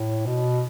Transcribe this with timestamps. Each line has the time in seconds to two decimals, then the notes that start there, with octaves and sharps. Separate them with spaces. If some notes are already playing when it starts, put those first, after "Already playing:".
Already playing: A2
0.26 B2